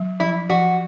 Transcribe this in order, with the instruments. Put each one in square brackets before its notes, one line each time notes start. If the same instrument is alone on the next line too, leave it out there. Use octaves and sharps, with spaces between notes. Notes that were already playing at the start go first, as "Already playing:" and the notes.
Already playing: [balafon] F#3
[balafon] F3 [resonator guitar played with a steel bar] E4
[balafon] F3 [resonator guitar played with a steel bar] F#4